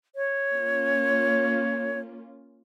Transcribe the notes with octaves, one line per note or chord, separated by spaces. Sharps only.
C#5
A#3 C#4 F4